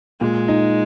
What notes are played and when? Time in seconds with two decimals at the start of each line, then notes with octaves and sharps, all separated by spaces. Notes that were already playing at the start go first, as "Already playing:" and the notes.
0.21 A#2 G#3
0.48 D#4